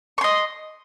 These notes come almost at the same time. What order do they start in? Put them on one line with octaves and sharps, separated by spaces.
C#6 C6 D#5